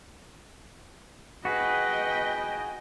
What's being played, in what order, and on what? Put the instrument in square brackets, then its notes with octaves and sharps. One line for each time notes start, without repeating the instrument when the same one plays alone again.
[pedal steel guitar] F#4 G#4 [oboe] B4 [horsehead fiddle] D#5 G5